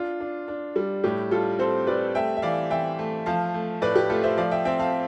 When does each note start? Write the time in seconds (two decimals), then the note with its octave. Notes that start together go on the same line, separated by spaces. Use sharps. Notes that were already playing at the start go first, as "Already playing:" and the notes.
Already playing: D4 F4
0.20 D4
0.48 D4
0.76 G3
1.04 A2 G4
1.31 G3 F4 A4
1.59 C4 A4 C5
1.87 G3 B4 D5
2.15 A3 E5 G5
2.36 E5
2.42 E3 D5 F5
2.70 E3 E5 G5
2.99 A3
3.26 F3 F5 A5
3.54 A3
3.82 A2 B4 D5
3.96 G4
4.10 A3 F4 A4
4.23 C5 E5
4.37 F3 D5 F5
4.51 E5 G5
4.65 C4 E5 G5
4.79 F5 A5